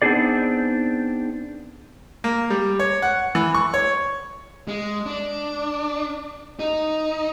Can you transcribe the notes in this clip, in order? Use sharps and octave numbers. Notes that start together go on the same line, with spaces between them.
B3 C4 D4 D#4 G#4 D5
A#3
G3
C#5
F#5
E3
C#6
C#5
G#3
D4
D#4